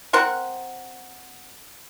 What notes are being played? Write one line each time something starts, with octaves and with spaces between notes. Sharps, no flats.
C4 A#4 C5 F#5